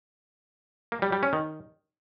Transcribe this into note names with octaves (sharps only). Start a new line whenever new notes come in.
A#3
G3
G3
C#4
D#3